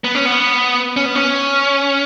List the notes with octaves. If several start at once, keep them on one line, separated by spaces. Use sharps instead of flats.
B3
C#4
B3
C#4
B3
C#4